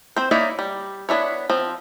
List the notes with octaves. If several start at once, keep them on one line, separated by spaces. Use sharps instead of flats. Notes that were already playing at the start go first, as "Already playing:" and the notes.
C4 C5
A#3 D#4 E4 C#5 D5
G3
B3 D4 E4 C#5
F3 C4